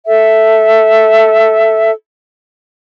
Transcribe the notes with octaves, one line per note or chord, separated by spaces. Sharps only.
A4 E5